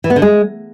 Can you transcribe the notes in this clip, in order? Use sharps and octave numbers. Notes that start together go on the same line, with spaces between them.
E3
B3
D3
G#3